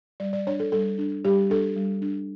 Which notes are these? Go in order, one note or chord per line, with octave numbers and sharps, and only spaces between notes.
G3 D5
D5
D4 C#5
A4
G3 A4
D4
G3 G4
D4 A4
G3
D4